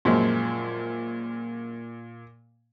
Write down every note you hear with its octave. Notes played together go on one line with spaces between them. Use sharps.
F#2 A#2 F3 G#3